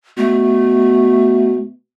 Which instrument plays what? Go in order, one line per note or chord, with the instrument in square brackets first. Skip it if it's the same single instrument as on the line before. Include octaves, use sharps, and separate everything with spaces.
[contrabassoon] B2 [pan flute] A3